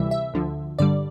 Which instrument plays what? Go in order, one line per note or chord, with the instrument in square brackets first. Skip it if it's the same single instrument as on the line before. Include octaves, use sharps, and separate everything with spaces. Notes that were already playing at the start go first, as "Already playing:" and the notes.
Already playing: [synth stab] D2 C3 E3 G3 E5
E5
D2 D3 F3
G2 D3 G3 D5